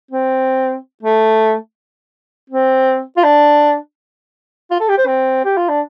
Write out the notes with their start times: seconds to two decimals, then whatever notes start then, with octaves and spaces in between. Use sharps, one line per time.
0.11 C4
1.03 A3
2.50 C4
3.17 F4
3.24 D4
4.71 F4
4.80 A4
4.88 G4
4.98 C5
5.07 C4
5.44 G4
5.57 F4
5.69 D4